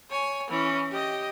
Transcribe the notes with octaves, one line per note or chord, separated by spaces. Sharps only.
C#5 G#5
E3 C#4
G4 D#5